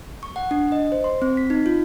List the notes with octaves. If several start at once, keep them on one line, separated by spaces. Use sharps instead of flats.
C#6
F#5
D4
D#5
C5
C6
C4
B6
D#4
F4